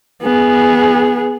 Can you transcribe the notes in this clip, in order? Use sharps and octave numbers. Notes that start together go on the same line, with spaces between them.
B3 G#4